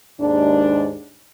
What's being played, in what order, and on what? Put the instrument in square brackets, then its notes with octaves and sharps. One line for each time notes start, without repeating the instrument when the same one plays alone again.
[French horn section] D#2 G#2 D4